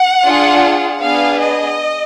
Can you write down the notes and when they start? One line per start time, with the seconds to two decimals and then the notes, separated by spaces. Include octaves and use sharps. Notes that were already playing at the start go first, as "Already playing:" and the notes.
Already playing: F#5
0.25 D4 F4 G#4
1.02 B3 D4 G#4 F5
1.42 D#5